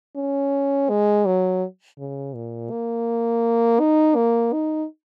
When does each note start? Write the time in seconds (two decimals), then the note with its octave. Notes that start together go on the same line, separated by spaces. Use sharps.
0.16 C#4
0.90 G#3
1.26 F#3
1.99 C#3
2.35 A#2
2.71 A#3
3.80 D#4
4.16 A#3
4.53 D#4